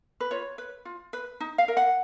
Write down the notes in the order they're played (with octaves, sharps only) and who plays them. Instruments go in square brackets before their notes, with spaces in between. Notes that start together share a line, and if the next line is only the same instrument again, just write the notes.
[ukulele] B4
F4 C#5
B4
F4
B4
D#4
F5
A#4
F#5